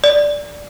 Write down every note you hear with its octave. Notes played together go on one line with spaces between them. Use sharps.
D5